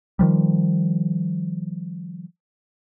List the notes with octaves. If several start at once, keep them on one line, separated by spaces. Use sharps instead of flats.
D#3 F3 G3